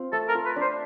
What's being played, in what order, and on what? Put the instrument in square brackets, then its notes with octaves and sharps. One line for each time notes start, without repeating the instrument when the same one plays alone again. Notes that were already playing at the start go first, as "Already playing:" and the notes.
Already playing: [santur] C4 F4
[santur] A3 [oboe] A4
[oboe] A#4
[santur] F4
[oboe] B4
[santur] D4
[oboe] C5